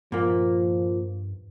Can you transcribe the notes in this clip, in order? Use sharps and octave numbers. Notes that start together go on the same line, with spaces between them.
G2 A#2 F3 A#3